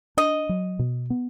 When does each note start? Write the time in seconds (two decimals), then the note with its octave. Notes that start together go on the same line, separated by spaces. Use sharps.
0.17 D4 D#5
0.49 F#3
0.79 B2
1.10 B3